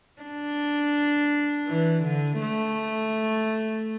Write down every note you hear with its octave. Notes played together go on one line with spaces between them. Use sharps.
D4
E3
D3
A3